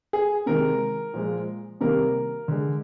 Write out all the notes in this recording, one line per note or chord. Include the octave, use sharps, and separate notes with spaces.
G#4
C3 D#3 G#3 A#4
A#2 F3 G#3
C3 D#3 G3 A#3 A#4
D3 G#3